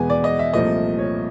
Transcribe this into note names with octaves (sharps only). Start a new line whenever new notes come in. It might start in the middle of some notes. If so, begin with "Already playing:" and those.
Already playing: E2 B2 G#3 B3 G#5
D5
D#5
E5
C2 A#2 F3 A3 D#5
C#5